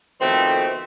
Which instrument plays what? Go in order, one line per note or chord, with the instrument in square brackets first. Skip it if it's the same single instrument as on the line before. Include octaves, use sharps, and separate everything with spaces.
[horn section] B2 D#3 F3 A3 C4